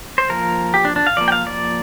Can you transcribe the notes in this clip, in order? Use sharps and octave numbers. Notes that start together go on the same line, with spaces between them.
C5
F3 A#3 A#4
G4
D4
D4
F5
F3 A#3 D5
G5
F5
D5